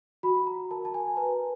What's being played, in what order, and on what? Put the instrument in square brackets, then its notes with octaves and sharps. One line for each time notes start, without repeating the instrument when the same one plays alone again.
[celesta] F#4 B5
A#5
A#4 A5
A5
G#5
B4 A#5